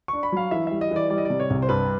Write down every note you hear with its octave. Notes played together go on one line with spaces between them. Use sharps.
D4 C#6
B5
F#3 F5
E3 E5
G3 E5
D#5
E3 D5
G3 D5
D#5
C3 D5
C#5
C2
C5
G2 B4